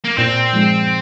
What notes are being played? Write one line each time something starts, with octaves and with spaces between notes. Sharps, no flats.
A#3
A#2 C4
F3 G#3